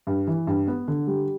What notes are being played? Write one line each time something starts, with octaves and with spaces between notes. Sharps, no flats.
G2
E3
G2
B3
D3
G3